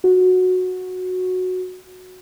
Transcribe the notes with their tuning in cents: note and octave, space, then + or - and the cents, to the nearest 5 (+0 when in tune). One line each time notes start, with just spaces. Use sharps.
F#4 -10